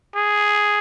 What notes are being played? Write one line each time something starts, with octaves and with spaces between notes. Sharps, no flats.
G#4